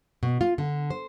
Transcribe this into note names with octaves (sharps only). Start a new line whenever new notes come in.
B2
F4
D3
C5